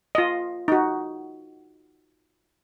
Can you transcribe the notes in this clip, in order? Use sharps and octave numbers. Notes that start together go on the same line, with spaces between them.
F4 D#5
D#4 F#4